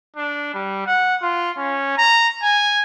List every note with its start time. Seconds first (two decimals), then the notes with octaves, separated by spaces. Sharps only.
0.16 D4
0.54 G3
0.86 F#5
1.22 F4
1.57 C#4
1.97 A#5
2.42 G#5